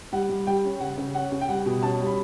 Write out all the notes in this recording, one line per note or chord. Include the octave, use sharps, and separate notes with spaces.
G3 F#5
G3
G3 G5
C#4
C#3 F#5
C#3
C#4 F#5
C#3
G5
G3 F#5
B2
C#4 A5
G3
B5